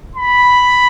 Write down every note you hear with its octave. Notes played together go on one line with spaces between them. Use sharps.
B5